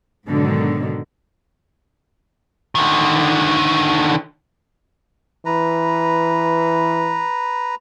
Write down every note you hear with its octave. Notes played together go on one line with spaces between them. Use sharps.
G#2 B2 D3 D#3 F#3
D3 D#3
E3 B4 A#5